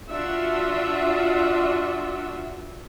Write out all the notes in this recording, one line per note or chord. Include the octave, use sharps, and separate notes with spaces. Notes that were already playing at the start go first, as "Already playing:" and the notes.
D4 F4 F#4 E5